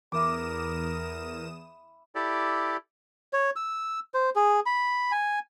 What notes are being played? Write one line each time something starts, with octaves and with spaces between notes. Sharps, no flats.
E2 E4 A#4 D6 D#6 E7
E4 G4 A4 D5
C#5
E6
C5
G#4
B5
G#5